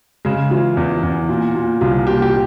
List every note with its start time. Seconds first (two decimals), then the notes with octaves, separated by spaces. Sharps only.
0.25 C#3 G#3
0.51 E3 F4
0.77 E2
1.03 E2
1.29 A#2
1.55 A#2
1.81 C2 F4
2.07 A#2 G4
2.22 G4